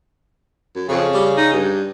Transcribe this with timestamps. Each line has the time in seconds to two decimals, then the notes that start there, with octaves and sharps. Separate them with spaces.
0.75 F#2
0.89 F2 C#3
1.14 G3
1.37 D#4
1.53 G2